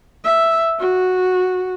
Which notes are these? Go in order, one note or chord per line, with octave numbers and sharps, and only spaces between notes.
E5
F#4